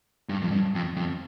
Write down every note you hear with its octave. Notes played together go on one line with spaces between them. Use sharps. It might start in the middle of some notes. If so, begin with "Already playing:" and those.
G2
F2
G2
F2
F2